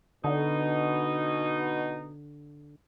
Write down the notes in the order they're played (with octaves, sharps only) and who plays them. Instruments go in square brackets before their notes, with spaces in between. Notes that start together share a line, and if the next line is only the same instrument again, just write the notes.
[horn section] B2 D#4 [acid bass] D3